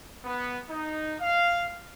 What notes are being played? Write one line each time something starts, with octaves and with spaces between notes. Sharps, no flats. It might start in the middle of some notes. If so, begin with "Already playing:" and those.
B3
D#4
F5